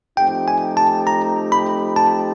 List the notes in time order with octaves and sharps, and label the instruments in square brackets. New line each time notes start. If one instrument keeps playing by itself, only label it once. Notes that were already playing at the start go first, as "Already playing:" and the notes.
[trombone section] F3 A3 C4 D#4 G4 [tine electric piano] G5
[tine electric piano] G#5
A5
A#5
B5
A5